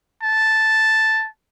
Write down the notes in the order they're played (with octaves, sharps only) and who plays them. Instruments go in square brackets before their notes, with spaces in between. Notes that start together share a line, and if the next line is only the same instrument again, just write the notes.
[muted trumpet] A5